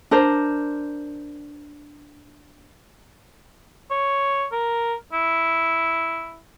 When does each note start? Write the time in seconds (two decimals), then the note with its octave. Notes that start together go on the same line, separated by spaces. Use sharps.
0.11 D4 A#4 C5
3.91 C#5
4.52 A#4
5.13 E4